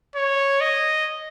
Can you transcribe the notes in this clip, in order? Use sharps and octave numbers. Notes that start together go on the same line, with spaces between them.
C#5
D#5